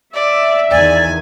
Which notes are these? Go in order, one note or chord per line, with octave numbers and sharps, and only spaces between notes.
D5 E5
E2 D#3 D5 G#5